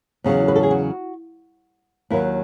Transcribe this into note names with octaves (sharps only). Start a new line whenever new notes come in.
E2 C#3 F#3
B4
A4
G#4
F#4
D#2 D#3 F#3 E4